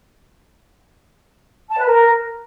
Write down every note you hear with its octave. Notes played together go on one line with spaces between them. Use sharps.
A5
B4
A#4